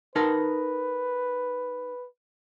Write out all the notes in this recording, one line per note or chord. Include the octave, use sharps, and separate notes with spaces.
D#4 A#4 B4 A5